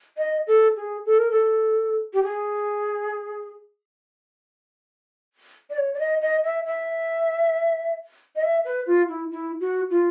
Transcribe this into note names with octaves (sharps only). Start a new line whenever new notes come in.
D#5
A4
G#4
A4
A#4
A4
G4
G#4
D5
C#5
D5
D#5
D#5
E5
E5
D#5
E5
B4
F4
E4
E4
F#4
F4